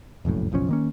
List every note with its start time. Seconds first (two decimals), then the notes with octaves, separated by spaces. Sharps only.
0.25 F1 A#1 F#2 A2
0.52 F#1 B1 F3 C#4
0.68 D#3 A#3 C#4